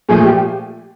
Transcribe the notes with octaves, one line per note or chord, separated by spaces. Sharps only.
A#2 F3 A3 G#4
G4